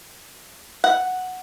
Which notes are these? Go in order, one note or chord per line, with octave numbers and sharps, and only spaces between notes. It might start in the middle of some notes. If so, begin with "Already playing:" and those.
F#5